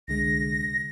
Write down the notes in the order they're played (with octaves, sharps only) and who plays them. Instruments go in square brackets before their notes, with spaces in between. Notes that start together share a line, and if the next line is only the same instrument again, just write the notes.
[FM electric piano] C2 D3 G#3 [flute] A#6